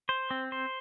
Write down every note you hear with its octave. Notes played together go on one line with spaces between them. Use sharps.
C5
C4
C5